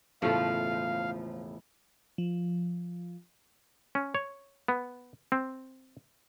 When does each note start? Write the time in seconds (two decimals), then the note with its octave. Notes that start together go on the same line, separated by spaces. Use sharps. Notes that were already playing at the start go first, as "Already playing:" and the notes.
0.22 E1 A2 C#3 F3 A3 F5
2.18 F3
3.95 C#4
4.15 C#5
4.68 B3
5.32 C4